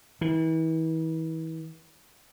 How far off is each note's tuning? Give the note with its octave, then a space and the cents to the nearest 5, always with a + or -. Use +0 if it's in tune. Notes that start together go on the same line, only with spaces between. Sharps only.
E3 -40